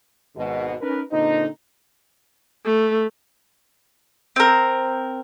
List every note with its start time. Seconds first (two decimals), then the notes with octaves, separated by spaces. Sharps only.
0.36 G#1 G#2 B2
0.80 C#4 D#4 A#4 B4
1.11 A#2 D3 C4 D#4
2.65 A3
4.36 C4 A#4